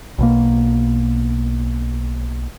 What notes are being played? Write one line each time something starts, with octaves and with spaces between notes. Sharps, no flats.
B1 B2 A#3